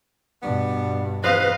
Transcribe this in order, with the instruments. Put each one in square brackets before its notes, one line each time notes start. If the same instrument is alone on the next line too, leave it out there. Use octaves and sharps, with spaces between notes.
[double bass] G2 B2 [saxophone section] B3 D4
[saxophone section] E2 C5 [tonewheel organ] B4 [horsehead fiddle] D#5 F5